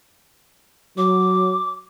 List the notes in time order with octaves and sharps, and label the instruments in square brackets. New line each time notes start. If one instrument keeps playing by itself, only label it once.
[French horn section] F#3 [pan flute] D6